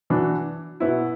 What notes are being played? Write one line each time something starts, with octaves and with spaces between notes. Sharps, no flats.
E3 D4 F#4
B2 B3 E4